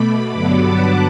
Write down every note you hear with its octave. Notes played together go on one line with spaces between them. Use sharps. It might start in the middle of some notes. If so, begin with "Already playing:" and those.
Already playing: B2 A3 B5 D6
G2 D3 F#3 B3 B5 D6
F#5 A5